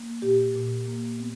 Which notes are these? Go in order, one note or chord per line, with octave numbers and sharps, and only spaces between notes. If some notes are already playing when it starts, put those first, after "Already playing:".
Already playing: A#3
A#2 G4
A#2
A#3
B3